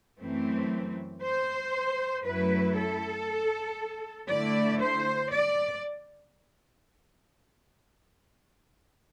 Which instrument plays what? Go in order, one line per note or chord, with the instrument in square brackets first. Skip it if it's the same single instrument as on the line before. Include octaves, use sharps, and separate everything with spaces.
[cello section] F#2 E3 A3 C4
C5
F#2 F#3 A3 E4 B4
A4
D3 A3 E4 D5
C5
D5